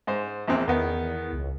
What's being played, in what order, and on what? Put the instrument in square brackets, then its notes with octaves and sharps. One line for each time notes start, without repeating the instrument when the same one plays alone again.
[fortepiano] G#2 C5
A#1 E2 C4
[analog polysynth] E2 [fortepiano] D#3 B3
[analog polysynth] C#2